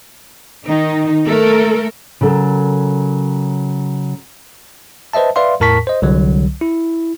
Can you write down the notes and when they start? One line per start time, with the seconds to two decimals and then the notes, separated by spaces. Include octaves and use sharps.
0.67 D#3 D#4
1.26 A3 A4 A#4
2.21 C#3 F#3 A4 A#4
5.13 B4 C5 D#5 E5 A5
5.36 B4 D5 E5 F5 C6
5.60 E2 A2 A#4 A5 C#6 B6
5.87 C5 D#5
6.02 C2 D3 F#3
6.61 E4